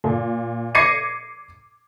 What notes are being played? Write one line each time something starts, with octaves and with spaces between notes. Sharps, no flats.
A#2
D6 G#6 A#6 C7 C#7 D#7